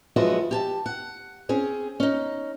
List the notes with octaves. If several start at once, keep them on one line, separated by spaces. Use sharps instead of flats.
F3 F#3 G#3 E4 F#4 B4
G4 G#5 A5
F#5
C4 C#4 G#4
C#4 D#4